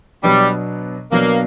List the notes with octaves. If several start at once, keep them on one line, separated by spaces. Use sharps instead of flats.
B2 F#3 G3 B3 D4
B2 F#3 A#3 B3 D4